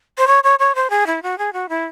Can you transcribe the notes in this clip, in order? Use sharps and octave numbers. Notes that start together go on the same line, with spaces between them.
C5
C#5
C#5
C#5
C5
G#4
E4
F#4
G#4
F#4
E4